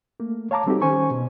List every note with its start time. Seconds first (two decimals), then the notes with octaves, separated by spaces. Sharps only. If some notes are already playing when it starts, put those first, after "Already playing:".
0.20 A3 A#3
0.51 C#5 F5 A5 A#5 D6
0.67 G3 C4 D#4 F#4 G4 A4
0.82 D#3 C#4 C5 G#5 C#6
1.11 B2